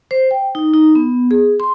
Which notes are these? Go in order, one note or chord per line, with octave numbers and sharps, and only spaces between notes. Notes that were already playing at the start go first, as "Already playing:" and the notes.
C5
G5
D#4
D#4
B3
G#4
C6